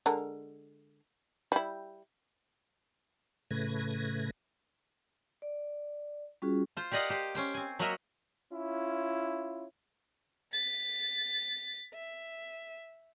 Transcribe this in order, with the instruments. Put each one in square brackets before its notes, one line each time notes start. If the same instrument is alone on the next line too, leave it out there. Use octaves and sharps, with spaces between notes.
[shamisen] D3 G#3 A#4
G3 E4
[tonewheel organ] A2 C#3 A3 B4 G#6 A#6
[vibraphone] D5
G3 C#4 F4 F#4 G#4
[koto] F4 C5
G4 A#4 D5 D#5 F5 F#5
G4 C5
C#4 C5 G5
C4 G#5
F#3 A#3 F#4 A#4 D#5 E5
[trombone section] C#4 E4 F4
[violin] A6 B6
E5